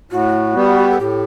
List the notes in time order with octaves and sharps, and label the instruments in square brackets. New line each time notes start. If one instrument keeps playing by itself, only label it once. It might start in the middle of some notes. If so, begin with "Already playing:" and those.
[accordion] A2 [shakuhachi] F#4
[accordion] G3 B3
[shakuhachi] A4
[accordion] A2 [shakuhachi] G4